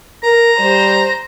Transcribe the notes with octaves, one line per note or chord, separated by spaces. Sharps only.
A#4 A#5
G3 C5